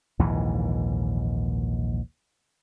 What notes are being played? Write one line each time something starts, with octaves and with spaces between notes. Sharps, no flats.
A#1 D#2 G#2 E3